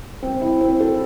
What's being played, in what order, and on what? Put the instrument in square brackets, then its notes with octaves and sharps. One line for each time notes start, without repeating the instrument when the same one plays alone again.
[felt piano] C4
E4
C4
A4